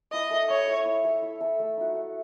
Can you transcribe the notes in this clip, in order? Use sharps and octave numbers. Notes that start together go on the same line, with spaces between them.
E4 D#5
A4 E5
E4 C#5
A4 E5
E4
A4 E5
E4
A4 E5
A3
D#4 F#4
A3